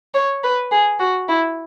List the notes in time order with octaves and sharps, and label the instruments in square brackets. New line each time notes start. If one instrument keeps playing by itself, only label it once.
[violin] C#5
B4
G#4
F#4
E4